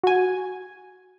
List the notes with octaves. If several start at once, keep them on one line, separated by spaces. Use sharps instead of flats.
F#4 G#5